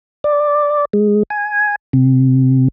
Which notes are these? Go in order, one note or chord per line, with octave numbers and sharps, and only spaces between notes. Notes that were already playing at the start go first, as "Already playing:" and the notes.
D5
G#3
G#5
C3